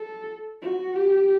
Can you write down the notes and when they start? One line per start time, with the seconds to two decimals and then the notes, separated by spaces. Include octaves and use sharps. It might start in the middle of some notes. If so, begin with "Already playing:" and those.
Already playing: A4
0.62 F#4
0.96 G4